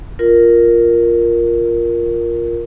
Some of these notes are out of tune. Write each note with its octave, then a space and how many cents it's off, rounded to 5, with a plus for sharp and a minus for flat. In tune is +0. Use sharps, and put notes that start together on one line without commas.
F4 +0 A#4 +0